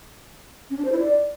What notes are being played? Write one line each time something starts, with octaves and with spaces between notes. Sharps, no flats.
C#4
D4
C5
E4
D5